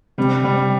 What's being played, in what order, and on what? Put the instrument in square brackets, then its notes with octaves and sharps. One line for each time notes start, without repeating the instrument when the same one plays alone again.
[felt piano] C3 [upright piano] G3
[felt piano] C3 [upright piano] G3